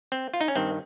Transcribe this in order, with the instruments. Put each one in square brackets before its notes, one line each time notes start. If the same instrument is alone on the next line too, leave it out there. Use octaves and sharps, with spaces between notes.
[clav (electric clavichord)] C4
F4
D#4
C#4
G2 D#3 C4